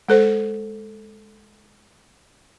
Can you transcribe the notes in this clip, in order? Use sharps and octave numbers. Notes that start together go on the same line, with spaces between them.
G#3 A4 C5